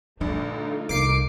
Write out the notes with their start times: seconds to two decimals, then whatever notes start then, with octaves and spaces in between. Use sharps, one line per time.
0.20 A#1 G2 D3 A3 D#4 F4
0.89 C2 D#3 A#3 D6 C7 D7